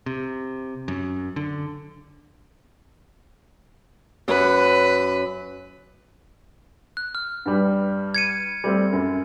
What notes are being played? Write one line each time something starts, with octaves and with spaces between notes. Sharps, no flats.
C3
F#2
D3
F#2 B4 C#5 F#6
F#6
F6
G2 G3 B4
G#6 C#7 D#7
G3 A3 C4
F#2